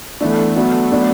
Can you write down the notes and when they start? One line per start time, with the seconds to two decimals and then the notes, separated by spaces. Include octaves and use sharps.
0.21 E3 A3 B3 D4
0.56 F#3 B3 D4
0.92 F#3 B3 D4